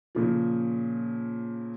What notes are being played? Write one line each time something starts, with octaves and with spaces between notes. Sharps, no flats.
A#2 C#3 F3